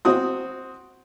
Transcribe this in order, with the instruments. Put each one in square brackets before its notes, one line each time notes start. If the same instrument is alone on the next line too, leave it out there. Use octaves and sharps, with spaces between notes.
[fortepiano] C4 F#4 D#6